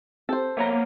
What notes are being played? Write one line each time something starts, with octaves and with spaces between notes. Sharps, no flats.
C4 G4 A4 C5 G5
A#3 B3 C#5 E5 A#5 B5